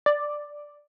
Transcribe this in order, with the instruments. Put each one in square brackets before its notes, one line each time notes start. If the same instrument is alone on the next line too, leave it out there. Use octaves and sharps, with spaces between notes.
[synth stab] D5